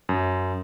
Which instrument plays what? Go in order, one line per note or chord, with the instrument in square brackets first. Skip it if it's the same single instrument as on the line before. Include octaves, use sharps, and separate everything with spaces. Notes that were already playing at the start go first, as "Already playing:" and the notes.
[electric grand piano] F#2